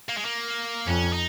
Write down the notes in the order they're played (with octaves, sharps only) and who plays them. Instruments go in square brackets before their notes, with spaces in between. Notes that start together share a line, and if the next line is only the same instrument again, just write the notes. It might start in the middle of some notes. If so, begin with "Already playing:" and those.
[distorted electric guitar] A#3
G#3
A#3
[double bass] F2 [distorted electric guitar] C#4
[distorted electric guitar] D#4